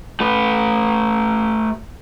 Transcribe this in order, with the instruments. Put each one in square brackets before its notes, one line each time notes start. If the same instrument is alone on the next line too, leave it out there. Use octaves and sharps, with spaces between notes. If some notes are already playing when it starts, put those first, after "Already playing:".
[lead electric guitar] A3 B4